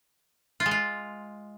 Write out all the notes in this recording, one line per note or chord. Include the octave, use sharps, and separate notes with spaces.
F4
G#3
F4